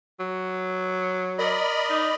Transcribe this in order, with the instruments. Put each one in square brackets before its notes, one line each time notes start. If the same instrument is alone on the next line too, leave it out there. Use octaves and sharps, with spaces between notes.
[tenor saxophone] F#3
[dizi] A#4 [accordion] D5 D#5 B5
[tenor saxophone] D#4